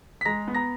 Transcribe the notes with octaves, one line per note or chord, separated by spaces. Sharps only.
B6
G#3 A#5 A#6
B3
A#5 A#6